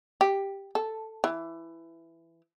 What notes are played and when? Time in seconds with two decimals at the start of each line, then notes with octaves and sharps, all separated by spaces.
0.21 G4
0.75 A4
1.24 E3